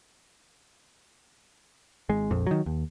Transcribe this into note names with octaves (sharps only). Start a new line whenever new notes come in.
G#1 G#3
A#1 F2
D#3 F#3
D#2